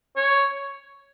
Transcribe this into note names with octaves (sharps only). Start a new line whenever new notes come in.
C#5